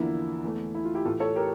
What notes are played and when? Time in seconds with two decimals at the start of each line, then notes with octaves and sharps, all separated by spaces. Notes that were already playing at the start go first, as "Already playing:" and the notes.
Already playing: E2 D3 F3 A#3 E4
0.44 E2 E3 A3
0.74 E4
0.85 F4
0.95 E4 G4
1.05 A2 E3 A3 F4 A4
1.20 A4 C#5
1.35 G4 A#4